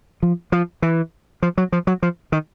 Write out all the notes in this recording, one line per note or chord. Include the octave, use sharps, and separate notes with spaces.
F3
F3
E3
F3
F#3
F3
F#3
F3
D#3